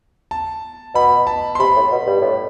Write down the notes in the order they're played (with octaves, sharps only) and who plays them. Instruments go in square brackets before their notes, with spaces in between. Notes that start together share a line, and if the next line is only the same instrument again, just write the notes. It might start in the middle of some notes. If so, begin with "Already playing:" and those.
[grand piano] A5
[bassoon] B2 [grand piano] B5
[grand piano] A5
C6
[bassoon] C3 [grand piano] B5
[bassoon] A2
B2
G2
A2